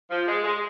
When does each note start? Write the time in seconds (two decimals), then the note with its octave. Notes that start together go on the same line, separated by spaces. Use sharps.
0.11 F3
0.28 G#3
0.44 G#3